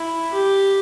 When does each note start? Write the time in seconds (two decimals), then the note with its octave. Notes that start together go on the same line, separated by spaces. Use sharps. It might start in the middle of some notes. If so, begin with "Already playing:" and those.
Already playing: E4
0.33 G4